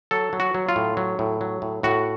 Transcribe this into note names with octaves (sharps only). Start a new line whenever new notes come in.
F#3 A4
F#3
F#4
F#3
F4
A2
F#3
A2
F#3
A2
A2 F#4